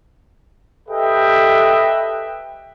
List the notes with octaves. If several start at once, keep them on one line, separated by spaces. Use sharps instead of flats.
G4 A4 B4 D#5 E5 G5